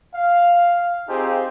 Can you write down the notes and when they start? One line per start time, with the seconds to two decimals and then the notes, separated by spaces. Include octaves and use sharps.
0.15 F5
1.08 C4 D#4 F4 G4 G#4 C5